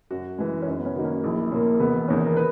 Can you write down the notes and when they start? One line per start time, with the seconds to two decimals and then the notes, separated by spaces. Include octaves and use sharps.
0.11 F#2 F#4
0.38 E3 G#3
0.62 C#4
0.67 F#2 D#4
0.79 B3
0.86 C#4
0.96 D#3 F#3 A#3 D#4
1.05 C#4
1.24 A#1 E4
1.52 A#2 A#3 C#4
1.80 E1 B3
2.08 E2 D#3 C#4
2.26 A#4
2.37 B4